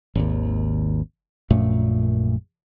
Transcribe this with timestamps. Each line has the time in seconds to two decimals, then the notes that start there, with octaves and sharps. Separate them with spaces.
0.15 G#1 D#2
1.50 A#1 F#2 A#2 A3